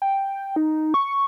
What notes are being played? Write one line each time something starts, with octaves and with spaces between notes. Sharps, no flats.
G5
D#4
C#6